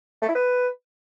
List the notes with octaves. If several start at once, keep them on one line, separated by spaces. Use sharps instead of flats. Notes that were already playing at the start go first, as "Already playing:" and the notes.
A3
E4
B4